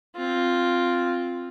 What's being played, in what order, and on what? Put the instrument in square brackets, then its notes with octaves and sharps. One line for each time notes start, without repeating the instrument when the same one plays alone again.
[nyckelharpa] C4 F4